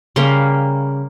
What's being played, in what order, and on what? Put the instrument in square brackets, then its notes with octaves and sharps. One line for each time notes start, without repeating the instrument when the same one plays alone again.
[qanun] C#3 G3 A#3 C6